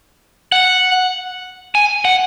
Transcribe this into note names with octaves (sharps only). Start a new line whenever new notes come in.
F#5
G#5
F#5